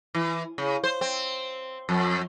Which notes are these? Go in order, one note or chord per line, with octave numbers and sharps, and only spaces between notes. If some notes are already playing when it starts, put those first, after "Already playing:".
E3
C#3
C5
C4
F2